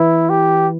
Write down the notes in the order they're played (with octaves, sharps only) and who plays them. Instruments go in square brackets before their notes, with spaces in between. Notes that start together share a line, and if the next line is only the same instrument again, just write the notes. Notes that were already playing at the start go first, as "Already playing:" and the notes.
Already playing: [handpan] E3 [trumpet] E4
[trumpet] G4